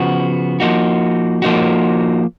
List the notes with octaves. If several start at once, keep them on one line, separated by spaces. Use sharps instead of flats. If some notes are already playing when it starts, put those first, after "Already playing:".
Already playing: C#3 F3 B3 F#4
F3 A#3 D#4 F#4
F3 A#3 D#4 F#4